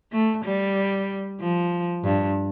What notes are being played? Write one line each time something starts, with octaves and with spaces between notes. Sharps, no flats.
A3
G3
F3
G2